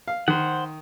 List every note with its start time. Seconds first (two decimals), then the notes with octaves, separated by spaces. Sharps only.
0.08 F5
0.28 D#3 C5 F#5